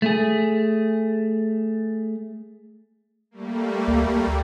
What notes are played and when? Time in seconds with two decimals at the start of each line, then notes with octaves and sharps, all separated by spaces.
0.02 A3 G#4
3.31 G3 A3 A#3
3.88 D2